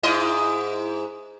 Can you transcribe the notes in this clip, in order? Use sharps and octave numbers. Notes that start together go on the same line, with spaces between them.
G#2 E4 D#5